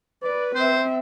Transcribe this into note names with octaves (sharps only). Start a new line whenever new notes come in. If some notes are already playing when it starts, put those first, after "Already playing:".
B4 D5
C4 C5 E5